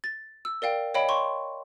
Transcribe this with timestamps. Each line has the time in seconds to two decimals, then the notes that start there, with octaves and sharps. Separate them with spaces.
0.04 A6
0.45 E6
0.62 A#4 D5 F5 G5
0.94 C#5 D#5 F5 G5 B5
1.09 C6 C#6